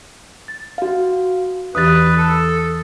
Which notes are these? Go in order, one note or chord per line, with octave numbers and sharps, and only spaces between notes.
A6
F#4 F5
E2 E3 G4 B4 D#6 A6
A4